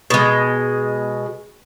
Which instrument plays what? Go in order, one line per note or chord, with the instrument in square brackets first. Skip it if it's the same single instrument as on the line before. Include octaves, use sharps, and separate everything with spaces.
[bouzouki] B2 G#3